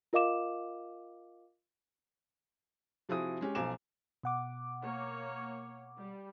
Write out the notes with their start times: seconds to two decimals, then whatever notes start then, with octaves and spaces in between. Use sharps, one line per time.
0.13 F4 A#4 D#5 F5 D6 E7
3.09 C3 F3 E4 F#4 G#4 D#6
3.41 G#3 C#4 G4
3.55 B1 F3 G#5 A#5 D6 E7
4.23 B2 F#5 D6
4.83 A#3 C#5
5.98 G3